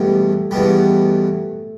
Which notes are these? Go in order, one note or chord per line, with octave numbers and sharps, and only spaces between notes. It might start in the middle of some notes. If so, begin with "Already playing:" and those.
Already playing: E2 B2 G3 A3
E2 B2 G3